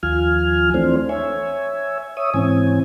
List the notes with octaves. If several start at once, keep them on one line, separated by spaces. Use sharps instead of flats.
D#2 F3 F4 G#5 F6
E3 A3 C4 D4 C5
C#5 E5 G#5
C#5 E5 D#6
G#2 E3 C4 C#4 G#5